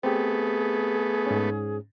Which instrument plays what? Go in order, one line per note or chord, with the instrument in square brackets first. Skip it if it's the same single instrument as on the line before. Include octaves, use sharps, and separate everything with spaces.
[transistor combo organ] A3 B3 [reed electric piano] C4 G4 [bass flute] G#4
[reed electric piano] G#2 C#4